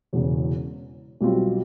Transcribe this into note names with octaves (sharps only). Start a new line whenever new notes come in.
E1 E2 C#3
B1 B2 G3 C4 F4